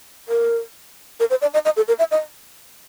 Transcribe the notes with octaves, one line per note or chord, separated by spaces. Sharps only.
A#4
A#4
C5
D5
D#5
D#5
A4
A#4
E5
D#5